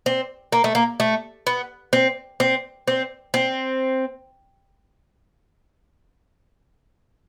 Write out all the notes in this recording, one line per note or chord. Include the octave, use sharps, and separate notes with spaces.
C4
A#3
A3
A#3
A3
B3
C4
C4
C4
C4